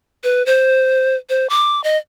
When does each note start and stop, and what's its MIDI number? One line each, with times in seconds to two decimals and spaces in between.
0.24 0.45 71
0.46 1.16 72
1.30 1.47 72
1.50 1.83 86
1.84 1.97 75